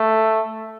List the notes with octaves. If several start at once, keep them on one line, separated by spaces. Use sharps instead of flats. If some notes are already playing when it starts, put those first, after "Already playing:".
Already playing: A3